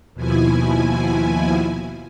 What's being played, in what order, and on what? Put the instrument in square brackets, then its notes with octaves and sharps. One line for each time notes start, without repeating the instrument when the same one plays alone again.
[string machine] D#2 B2 F3 E4 G#5